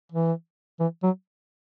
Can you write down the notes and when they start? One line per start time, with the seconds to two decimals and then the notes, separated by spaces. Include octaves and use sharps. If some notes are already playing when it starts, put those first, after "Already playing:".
0.12 E3
0.80 E3
1.03 F#3